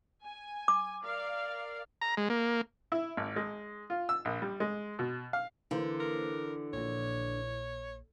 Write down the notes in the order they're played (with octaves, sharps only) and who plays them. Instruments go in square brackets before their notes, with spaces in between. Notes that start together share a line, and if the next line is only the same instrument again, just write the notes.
[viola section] G#5
[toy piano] D6
[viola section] A#4 D5 F5
[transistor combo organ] A#5
G#3
A#3
[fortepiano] E4
G#1
G#3
F4
E6
A#1
G3
G#3
B2
F5
[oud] D3 [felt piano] E3 [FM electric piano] A#3 C5
[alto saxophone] A#4
[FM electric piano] A#1 A#2 [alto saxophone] C#5